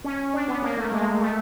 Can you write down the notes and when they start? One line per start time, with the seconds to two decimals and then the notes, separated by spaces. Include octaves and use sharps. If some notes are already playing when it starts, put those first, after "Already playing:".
0.04 C#4
0.34 D4
0.48 B3
0.62 A#3
0.77 A3
0.92 G#3
1.21 A3